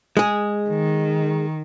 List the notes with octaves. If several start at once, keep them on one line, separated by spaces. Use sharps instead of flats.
G#3 G#4
D#3